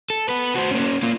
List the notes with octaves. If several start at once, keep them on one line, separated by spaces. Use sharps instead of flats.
A4
B3 B4
F#4 C5
A#3 C#4
A#3 F4